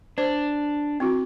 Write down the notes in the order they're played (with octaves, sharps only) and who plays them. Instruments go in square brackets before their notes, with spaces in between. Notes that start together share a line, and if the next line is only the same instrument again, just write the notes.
[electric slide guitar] D4 [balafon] C5
[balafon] C4 E4 F#4